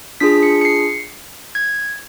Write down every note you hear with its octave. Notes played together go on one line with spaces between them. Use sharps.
D4 F4 G#4 B6
C#7
C#7
C7
G#6